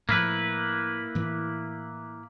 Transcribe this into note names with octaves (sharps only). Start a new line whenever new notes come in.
A2 F3 A#3 E4 B4
A2 E3